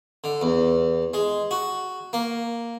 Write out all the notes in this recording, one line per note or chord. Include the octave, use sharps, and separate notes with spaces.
D3
E2
G#3
F#4
A#3